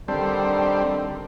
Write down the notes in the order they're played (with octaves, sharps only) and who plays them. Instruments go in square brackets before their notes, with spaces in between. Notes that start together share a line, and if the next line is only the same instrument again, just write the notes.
[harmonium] D3 D#3 [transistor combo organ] G3 C4 [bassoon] D4